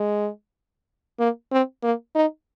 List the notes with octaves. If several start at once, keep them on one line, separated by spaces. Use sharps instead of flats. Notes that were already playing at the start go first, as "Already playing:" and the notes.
Already playing: G#3
A#3
C4
A#3
D#4